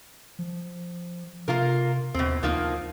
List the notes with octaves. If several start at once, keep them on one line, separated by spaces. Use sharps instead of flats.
F3
C3 A#3 F4 A#4
D#2 B2 C4
D2 F3 A#3 D#4